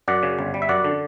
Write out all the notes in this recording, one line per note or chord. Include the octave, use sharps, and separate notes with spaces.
F#2 D5 F#5
C#3
G1
G3
E5
F#2 D5 F#5
D3